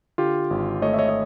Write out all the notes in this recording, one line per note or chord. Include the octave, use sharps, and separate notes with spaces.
D3 F4 G4
G#1
A3 C#5 D#5
E5
C#5 D#5
D#5